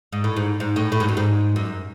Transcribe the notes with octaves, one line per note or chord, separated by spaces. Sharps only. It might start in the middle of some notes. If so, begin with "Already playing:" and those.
G#2
A2
G#2
G#2
A2
A2
G#2
F#2
G#2
F#2